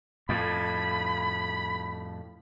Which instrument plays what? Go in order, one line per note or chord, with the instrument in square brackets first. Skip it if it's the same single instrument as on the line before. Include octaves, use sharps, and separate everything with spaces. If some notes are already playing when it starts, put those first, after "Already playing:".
[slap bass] F2 A2 [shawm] B5